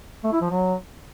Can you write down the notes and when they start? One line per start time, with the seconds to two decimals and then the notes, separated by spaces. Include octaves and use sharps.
0.24 A3
0.33 E4
0.41 F3
0.50 F#3